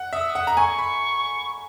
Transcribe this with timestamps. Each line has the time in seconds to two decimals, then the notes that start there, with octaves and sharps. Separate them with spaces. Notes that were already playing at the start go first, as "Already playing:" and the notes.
Already playing: F#5
0.13 E5 D#6
0.21 E6
0.30 D#6
0.35 F#5
0.47 A#5
0.57 G#5 C#6
0.79 B5